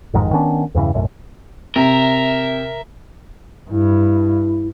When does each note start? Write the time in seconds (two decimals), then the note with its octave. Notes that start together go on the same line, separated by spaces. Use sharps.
0.14 A1 F2 G#2 D#3
0.33 D#3 B3 C#4 D4
0.75 E2 G2 C#3 E3
0.94 B1 F#2 A2
1.76 C3 A#4 E5
3.71 G2 E4